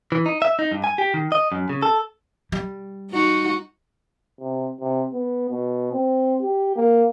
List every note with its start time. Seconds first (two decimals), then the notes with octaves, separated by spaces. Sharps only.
0.12 E3
0.26 D#4
0.42 E5
0.59 D#4
0.72 G2
0.84 G#5
0.98 G4
1.14 D#3
1.32 D#5
1.52 F#2
1.69 C#3
1.83 A4
2.52 G3
3.11 D#4 F#4
4.40 C3
4.80 C3
5.13 B3
5.50 B2
5.92 C4
6.41 G4
6.76 A#3